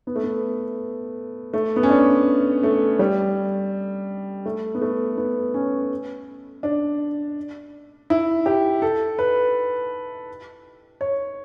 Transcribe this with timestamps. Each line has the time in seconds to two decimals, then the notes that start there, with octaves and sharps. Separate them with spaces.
0.07 B3
0.16 A3
0.24 B3
1.54 A3
1.76 B3
1.83 C#4
1.90 D4
2.63 A3
2.99 G3
4.46 A3
4.75 B3
4.82 A3
5.17 B3
5.54 C#4
6.63 D4
8.10 E4
8.46 G4
8.82 A4
9.19 B4
11.01 C#5